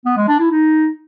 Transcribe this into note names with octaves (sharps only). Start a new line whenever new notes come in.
B3
G#3
D4
E4
D#4